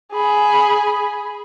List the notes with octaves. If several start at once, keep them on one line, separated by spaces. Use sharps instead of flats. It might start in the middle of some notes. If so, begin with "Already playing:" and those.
G#4 B5